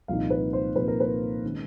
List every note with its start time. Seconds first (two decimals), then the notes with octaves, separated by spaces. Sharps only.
0.08 C2 A#2 F3 A#3 D#4 F5
0.30 B4
0.53 C5
0.75 C2 A#2 F3 A#3 D#4 B4
0.88 A#4
1.00 B4
1.45 D#3 G#3 C#4